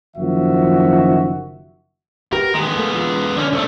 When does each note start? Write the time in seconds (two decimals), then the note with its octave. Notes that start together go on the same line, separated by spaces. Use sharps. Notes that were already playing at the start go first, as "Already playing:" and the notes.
0.17 F#1 D#3 F3 F#4 E5
2.33 F#4 G4 A#4 B4
2.54 D#3 G#3 B3
2.76 A3 A#3
2.95 F4
3.37 D3 C#4 D4
3.53 C2 A3